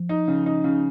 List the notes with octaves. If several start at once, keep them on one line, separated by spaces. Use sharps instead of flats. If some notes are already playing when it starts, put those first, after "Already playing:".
Already playing: F3
D#4
C#3
D#4
C#3